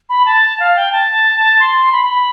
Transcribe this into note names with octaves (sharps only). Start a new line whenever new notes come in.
B5
A5
F5
G5
A5
C6
B5
B5